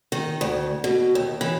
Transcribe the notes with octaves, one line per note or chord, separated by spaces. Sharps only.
D#3
D2
B2
D#2
E3